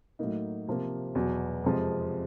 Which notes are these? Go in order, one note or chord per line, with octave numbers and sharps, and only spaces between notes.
A2 F#3 A#3 D#4
C3 F3 A#3
E2 B2 F#3
F2 C3 F3 G#3 C4